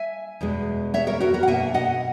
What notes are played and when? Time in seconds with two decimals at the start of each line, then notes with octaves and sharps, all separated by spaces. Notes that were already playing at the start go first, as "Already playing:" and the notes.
Already playing: E5 G#5
0.41 E2 B2 G#3
0.94 C#5 E5
1.07 A#4 C#5
1.20 F#4 A#4
1.34 F#4 A#4
1.43 F#5
1.47 B2 A#3 E5 G#5
1.74 D#5 F#5